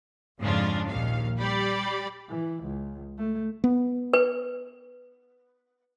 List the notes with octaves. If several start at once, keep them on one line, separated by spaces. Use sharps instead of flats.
F2 G#2 C#3 D4 F4
A#1 D#2 F5
G3 G4 D5 B5
E3
C#2
A3
B3
B4